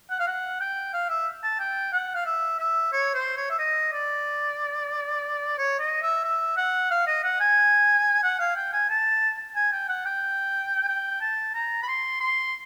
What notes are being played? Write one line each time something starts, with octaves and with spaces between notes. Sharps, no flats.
F#5
F5
F#5
G5
F5
E5
A5
G5
F#5
F5
E5
E5
C#5
C5
C#5
E5
D#5
D5
C#5
D#5
E5
E5
F#5
F5
D#5
F#5
G#5
F#5
F5
G5
G#5
A5
G#5
G5
F#5
G5
G5
A5
A#5
B5
C6
C6